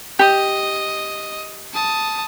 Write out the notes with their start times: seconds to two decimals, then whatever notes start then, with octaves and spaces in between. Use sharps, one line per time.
0.19 G4 D#5
1.73 A5 D#6